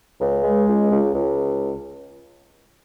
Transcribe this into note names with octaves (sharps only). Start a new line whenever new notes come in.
C#2
G#3
C#2
C#2
C#2